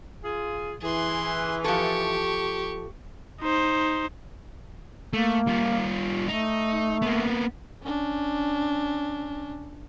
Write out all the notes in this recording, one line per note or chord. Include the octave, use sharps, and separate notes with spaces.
F4 G#4
E3 G#4 C6
F3 G4 A4 C#6
D#4 C5
A3 A#3
G3 F4
A3 D#4
A#3 B3
C#4 D4